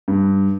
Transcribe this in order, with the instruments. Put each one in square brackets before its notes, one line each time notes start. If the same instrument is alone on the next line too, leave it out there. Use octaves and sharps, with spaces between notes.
[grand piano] G2